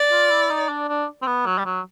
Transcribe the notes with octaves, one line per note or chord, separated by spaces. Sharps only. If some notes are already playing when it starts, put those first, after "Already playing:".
Already playing: D5
F4
E4
D#4
D4
D4
C4
B3
F#3
G3
F#3